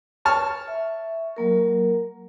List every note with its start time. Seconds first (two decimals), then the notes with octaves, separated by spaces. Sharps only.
0.25 C#5 A5 F6
0.68 E5
1.37 F#3 A#3 A#4